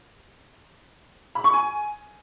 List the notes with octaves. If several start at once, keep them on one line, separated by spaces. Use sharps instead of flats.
B5
C#6
G#5